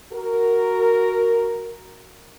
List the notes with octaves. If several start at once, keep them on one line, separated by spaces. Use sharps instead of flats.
F#4 A#4